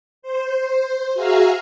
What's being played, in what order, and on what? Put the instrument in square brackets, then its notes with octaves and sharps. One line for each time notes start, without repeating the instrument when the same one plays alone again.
[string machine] C5
F#4 G#4 E5 F5 A#5 F6